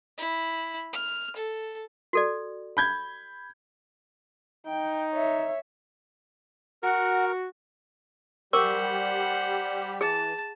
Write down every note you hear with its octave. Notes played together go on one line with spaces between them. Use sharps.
E4
F6
A4
F#4 A4 D5
B5 G6 G#6
D#4 G5
C#5 E5
F#4 A#4 F#5
G3 G4 A#4 C5 F#5 C#6 D6
E3 G#4 A5